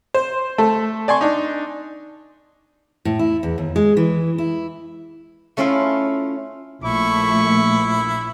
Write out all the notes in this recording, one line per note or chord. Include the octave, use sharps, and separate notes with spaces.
C5
A3 A4
D5 G#5 C6 C#6
D4 D#4
A2
E4
E2
D#2
G#3
E3
E4
A3 C#4 E4 F4 F5
A#1 A3 E4 C#6